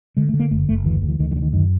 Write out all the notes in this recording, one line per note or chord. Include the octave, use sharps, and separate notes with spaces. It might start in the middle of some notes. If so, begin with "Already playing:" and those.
D3 G#3
A3
D3
A#3
F#1 A3
F#1 A3
D2 E3
D2
E3
D2 D#3
D#3
D3
D#3
F#2 D#3